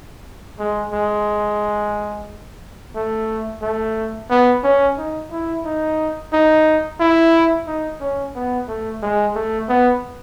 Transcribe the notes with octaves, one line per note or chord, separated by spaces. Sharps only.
G#3
G#3
A3
A3
B3
C#4
D#4
E4
D#4
D#4
E4
D#4
C#4
B3
A3
G#3
A3
B3